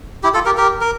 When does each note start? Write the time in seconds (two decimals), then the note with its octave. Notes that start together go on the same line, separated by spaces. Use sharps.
0.23 E4 G4
0.34 F4 A4
0.45 G4 A#4
0.57 G4 A#4
0.81 A#4